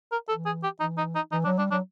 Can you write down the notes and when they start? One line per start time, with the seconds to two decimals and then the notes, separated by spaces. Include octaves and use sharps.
0.12 A#4
0.29 E3 A4
0.46 G#4
0.63 G4
0.80 E3 D#4
0.98 D#4
1.15 D#4
1.32 E3 D#4
1.45 F#3 D4
1.58 G3 D4
1.71 F#3 D4